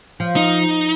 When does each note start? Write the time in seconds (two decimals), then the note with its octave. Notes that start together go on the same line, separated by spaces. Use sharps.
0.20 F3
0.36 D#4